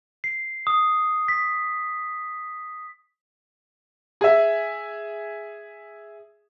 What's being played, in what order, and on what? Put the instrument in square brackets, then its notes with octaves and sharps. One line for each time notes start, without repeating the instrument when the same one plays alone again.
[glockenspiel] C7
D#6
B6
[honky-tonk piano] G#4 E5